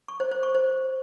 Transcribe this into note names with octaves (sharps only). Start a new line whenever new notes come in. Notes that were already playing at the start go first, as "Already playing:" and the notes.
C#6
C5
C5
C#6
C5